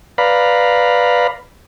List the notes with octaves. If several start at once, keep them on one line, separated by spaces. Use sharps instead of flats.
B4 D5 F5 A#5 B5